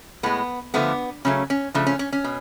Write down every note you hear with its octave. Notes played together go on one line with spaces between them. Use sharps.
A2 G#3 B3
D3 F3 A3 B3
C#3 F#3 A3 C#4
C#4
C#3 F3 A3 D4
C#4
C#4
C#4
B2